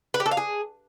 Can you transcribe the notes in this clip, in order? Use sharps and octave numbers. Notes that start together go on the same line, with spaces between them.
B4
G4
A4
F5
G#4